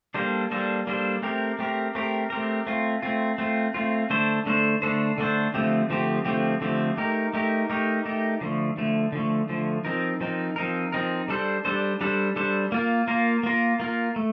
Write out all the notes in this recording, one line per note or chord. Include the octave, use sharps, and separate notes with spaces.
G3 A#3 D4 A4 C5
G3 A#3 D4 A4 C5
G3 A#3 D4 A4 C5
A3 C4 G4 A#4
A3 C4 G4 A#4
A3 C4 G4 A#4
A3 C4 G4 A#4
A3 C4 F4
A3 C4 F4
A3 C4 F4
A3 C4 F4
D3 A3 D4 A4 C5
D3 A3 D4 A4 C5
D3 A3 D4 A4 C5
D3 A3 D4 A4 C5
D3 F3 A3 C4 G4
D3 F3 A3 C4 G4
D3 F3 A3 C4 G4
D3 F3 A3 C4 G4
A3 D#4 G4 A#4
A3 D#4 G4 A#4
A3 D#4 G4 A#4
A3 D#4 G4 A#4
D3 F3 A3
D3 F3 A3
D3 F3 A3
D3 F3 A3
F3 C4 D#4 A#4
F3 C4 D#4 A#4
F3 C4 D#4 A#4
F3 C4 D#4 A#4
G3 D4 A4 C5
G3 D4 A4 C5
G3 D4 A4 C5
G3 D4 A4 C5
A#3 F4 A#4
A#3 F4 A#4
A#3 F4 A#4
A#3 F4 A#4
A3